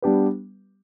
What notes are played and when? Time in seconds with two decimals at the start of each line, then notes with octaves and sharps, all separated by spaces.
0.02 G3 B3 D4 G4 B4